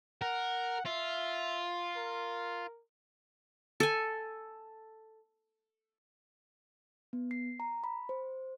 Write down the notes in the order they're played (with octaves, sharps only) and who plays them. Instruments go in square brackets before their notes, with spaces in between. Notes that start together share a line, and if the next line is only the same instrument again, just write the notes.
[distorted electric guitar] A#4 [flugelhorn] F#5
[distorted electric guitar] F4 [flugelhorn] E5
[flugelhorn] A#4
[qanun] A4 G#5
[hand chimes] B3
C7
A#5
B5
C5